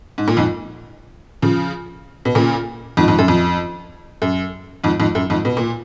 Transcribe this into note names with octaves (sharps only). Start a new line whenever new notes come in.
G#2
A#2
F2 G#2
C#3 F3
B2
A#2 C#3
F2 G#2
F2 G#2
F#2
F2
F#2
F2 G#2
F2 G#2
F#2
F2 G#2
B2
A#2